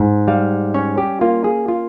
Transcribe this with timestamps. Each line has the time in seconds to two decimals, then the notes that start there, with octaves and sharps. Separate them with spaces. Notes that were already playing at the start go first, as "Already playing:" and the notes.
Already playing: G#2
0.28 G3 F5
0.74 C#4 C#5
0.98 G4
1.21 A#3 F4
1.44 G#4
1.68 F4